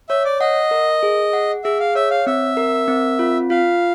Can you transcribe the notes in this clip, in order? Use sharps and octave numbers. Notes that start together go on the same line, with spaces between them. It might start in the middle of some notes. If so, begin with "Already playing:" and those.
C#5 E5
D5
D#5 F#5
A#4
G#4
F#5
G#4 E5
F5
C#5 E5
F5
C4 E5
A#4
C4
F4
F4 F5